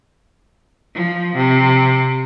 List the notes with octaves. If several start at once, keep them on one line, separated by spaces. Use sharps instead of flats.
F3
C3